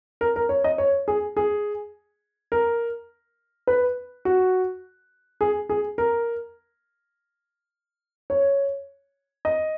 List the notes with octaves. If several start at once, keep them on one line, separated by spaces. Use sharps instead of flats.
A#4
A#4
C#5
D#5
C#5
G#4
G#4
A#4
B4
F#4
G#4
G#4
A#4
C#5
D#5